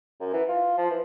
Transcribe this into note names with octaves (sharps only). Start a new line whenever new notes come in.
F#2
E3
F4
F3
E3